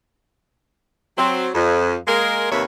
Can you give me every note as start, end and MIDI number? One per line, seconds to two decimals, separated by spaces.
1.18 1.48 54
1.18 1.48 60
1.55 1.94 41
2.07 2.47 56
2.07 2.47 58
2.07 2.47 70
2.51 2.63 39
2.51 2.63 48
2.51 2.63 58
2.51 2.63 71
2.51 2.63 73
2.51 2.63 76